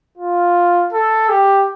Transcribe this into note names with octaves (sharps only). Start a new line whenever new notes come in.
F4
A4
G4